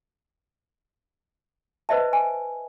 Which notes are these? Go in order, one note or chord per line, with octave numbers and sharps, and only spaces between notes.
B4 C5 D#5 E5 A5
G#5